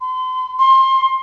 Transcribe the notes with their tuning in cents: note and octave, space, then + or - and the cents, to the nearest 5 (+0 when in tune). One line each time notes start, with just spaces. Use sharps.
C6 -35
C6 +25